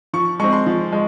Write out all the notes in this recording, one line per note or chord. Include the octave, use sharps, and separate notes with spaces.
F3 C#6
G#3 C4 C#6
C6
F3
G#3